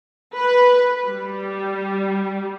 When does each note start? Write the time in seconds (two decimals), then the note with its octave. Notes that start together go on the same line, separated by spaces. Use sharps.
0.35 B4
1.06 G3